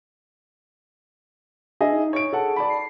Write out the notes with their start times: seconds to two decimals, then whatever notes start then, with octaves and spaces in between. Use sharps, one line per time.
1.81 D4 G#4 D#5 E5
1.93 D#4
2.13 C#5 D7
2.33 G#4 A4 F#5 A5
2.56 D5 A5 B5
2.69 C7